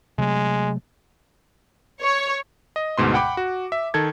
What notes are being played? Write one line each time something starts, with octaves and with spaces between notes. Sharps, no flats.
C3 F#3 G#3 A3
C#5
D#5
D2 G#2 B2 C6
F#5 G5 B5 D6
F#4
E5
D#3 A4 G#6